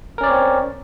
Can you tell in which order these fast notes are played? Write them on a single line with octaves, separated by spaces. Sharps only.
A#4 C#4 D5 C#5 C4